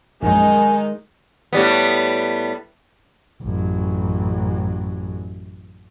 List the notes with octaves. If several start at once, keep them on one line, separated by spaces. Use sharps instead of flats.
A#1 F#2 D#3 G#3 D#4 D#5 G#5
A2 G3 B3
A1 F#2